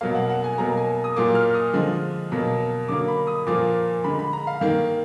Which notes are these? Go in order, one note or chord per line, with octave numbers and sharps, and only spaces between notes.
B2 F#3 A#3 F5
F#5
F#5
G#5
B2 F#3 A#3 A#5
G#5
D#6
A#2 F#3 A#3 D6
F6
D#6
D3 F3 G#3
B2 F#3 A#3
D3 F#3 A#3 D6
B5
D#6
A#2 F3 A#3 D6
D3 G#3 B5
B5
A#5
F5
D#3 A#3